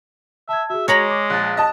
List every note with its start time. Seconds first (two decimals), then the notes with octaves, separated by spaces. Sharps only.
0.49 E5 A5 G#6
0.70 F#4 G#4 E5
0.88 G#3 C#5 A#5 B5
1.10 D6 A#6
1.30 A#1 F#6 A6
1.57 D#5 A5